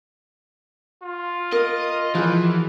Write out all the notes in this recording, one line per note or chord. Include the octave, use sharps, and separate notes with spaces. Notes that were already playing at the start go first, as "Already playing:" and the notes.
F4
A#4 D#5
E3 F3 F#4 G#4